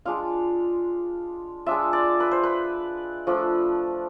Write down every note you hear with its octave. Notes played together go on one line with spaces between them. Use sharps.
G#3 D4 F4 F5
G#3 D4 F4 E5
D5
B4
C5
B4
F3 A3 D4